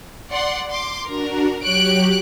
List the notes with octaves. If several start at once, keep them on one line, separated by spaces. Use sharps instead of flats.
D5 F#5 C6
C6 D6
D4 F#4 A#4
F#3 G4 C#5 F#6 D7